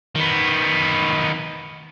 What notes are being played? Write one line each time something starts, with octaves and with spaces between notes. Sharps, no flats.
D#3 B3